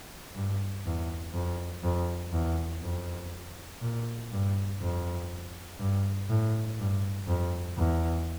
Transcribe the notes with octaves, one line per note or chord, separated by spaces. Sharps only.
G2
E2
F2
F2
E2
F2
A#2
G2
F2
G2
A2
G2
F2
E2